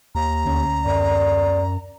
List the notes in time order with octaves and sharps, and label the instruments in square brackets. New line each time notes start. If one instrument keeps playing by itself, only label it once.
[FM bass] D#2 [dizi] A#5
[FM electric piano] D2 C#4
[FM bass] F#2 [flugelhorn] D5